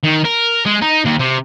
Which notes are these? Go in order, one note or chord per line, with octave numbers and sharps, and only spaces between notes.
D#3
A#4
G#3
D#4
D#2
C3